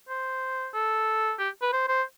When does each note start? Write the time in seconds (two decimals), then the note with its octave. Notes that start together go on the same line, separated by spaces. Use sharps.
0.09 C5
0.74 A4
1.39 G4
1.62 B4
1.73 C5
1.88 C5